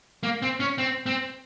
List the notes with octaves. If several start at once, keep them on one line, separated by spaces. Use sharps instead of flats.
A#3
C4
C#4
C4
C4